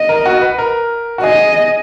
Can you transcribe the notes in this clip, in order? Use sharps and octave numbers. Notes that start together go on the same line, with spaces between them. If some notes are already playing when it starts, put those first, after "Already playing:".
Already playing: D#5
A#4
F#4
B4
A#4
F#4
G#4 D#5